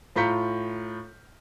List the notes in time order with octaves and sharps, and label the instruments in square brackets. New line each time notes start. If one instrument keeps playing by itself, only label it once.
[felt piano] A2 F4 A#5 G6 B6 C#7